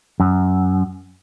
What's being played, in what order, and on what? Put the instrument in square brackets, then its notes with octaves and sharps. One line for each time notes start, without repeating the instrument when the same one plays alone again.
[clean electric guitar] F#2